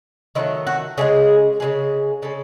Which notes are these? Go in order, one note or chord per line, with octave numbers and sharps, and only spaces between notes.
D#3 F#3 A3 E4
F#4
C#3 E3 G#3 G#4
C#3 E3 G#3
C#3 G#3 A4